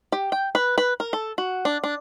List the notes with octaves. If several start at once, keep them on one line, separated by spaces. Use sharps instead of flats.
G4
G5
B4
B4
A#4
A4
F#4
D4
D4